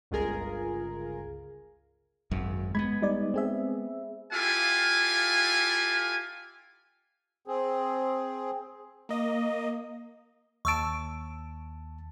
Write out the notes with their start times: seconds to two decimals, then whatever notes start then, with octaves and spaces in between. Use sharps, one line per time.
0.11 G1 C#2 F4 G#4 A#4
2.31 G#1 F#2
2.75 G#3 A3 B3 B5 G#6
3.02 G3 D#4 D5
3.34 C4 G#4 E5
4.33 E4 F4 G4 A4 F5 G#5
7.47 C4 G#4
9.09 A#3 D#5
10.65 D#2 A5 C#6 E6 D7